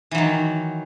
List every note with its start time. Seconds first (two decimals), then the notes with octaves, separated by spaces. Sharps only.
0.11 E3
0.15 F#3
0.18 D#3